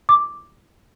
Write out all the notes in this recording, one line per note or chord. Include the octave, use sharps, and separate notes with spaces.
D6